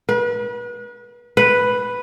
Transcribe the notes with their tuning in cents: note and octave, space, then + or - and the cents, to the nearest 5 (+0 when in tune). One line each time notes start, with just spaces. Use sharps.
B4 -35
B4 +0